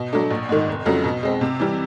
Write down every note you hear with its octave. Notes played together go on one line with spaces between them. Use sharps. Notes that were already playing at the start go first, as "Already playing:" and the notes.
Already playing: B2
F#3 A3 D4
A#1
G#2 D#3
F1
F2 C#3 F#3 A3
B2
G#3 C4
C3
E3 G3